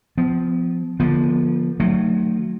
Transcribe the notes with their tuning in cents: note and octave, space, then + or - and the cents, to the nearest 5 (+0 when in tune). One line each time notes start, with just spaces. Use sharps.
F3 +0 B3 +45
D3 +0 F3 +0 B3 -45
D#3 -40 F#3 +0 A3 +20